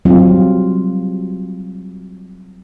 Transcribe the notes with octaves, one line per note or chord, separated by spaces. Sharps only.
F#3 G3 C4 F4